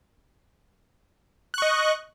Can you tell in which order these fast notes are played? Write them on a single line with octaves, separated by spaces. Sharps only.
F#6 C#6 D#5